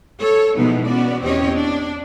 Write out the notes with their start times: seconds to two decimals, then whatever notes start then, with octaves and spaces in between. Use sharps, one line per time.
0.20 A4 C#5
0.56 B2 E3 F3 G#3 B3 D#4
0.86 B3 C#4 F#4 D5
1.22 E2 C4 C#4 G4 C#5 D#5
1.54 D4